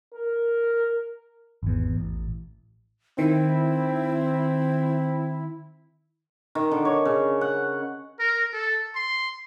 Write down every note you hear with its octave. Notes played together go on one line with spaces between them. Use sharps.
A#4
G#1 E2
A1
D#3 C4 E4
D#3
D3
C#5
C#3
F#5
A#4
A4
C6